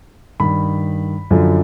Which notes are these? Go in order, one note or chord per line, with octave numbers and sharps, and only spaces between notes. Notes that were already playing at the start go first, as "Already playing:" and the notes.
G2 D#3 B5
F#2 D3 F3